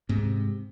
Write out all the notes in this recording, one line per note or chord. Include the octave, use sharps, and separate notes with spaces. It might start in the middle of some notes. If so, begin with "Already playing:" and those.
G#2 C3